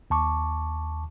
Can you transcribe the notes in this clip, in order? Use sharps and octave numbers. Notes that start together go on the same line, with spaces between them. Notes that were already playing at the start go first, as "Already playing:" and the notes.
D#2 A5 C#6 D6